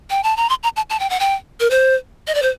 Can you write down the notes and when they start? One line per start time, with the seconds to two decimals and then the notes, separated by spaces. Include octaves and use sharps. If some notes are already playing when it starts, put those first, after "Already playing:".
0.10 G5
0.23 A5
0.37 A#5
0.49 C6
0.63 A#5
0.76 A5
0.90 A5
1.00 G5
1.10 F#5
1.20 G5
1.60 A#4
1.71 C5
2.27 D#5
2.35 D5
2.42 C5